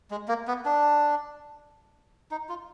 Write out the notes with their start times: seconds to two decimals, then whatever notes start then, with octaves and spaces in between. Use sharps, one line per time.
0.11 G#3
0.28 A#3
0.48 B3
0.65 D4
2.31 D#4
2.49 F4